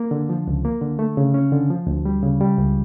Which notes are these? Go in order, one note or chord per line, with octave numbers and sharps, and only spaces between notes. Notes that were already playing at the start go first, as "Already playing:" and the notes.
Already playing: A#3
D3
F3
C#2
A#3
D3
A3
C#3
C#4
D3
F3
D2
G3
C#3
G3
C#2